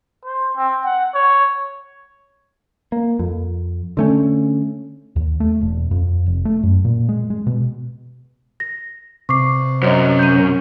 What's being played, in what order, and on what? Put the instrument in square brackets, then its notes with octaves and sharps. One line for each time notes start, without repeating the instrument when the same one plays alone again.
[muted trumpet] C5
C4
F#5
C#5
[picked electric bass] A#3
F2
D3 A3 C#4
D#2
A3
E1
F2
F1
A3
F#2
A#2
G#3
G#3
B2
[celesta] A#6
[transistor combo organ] C3 [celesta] C#6 D6 C7
[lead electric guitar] F#2 [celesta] C5 C#5 D#5
[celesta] G6 D#7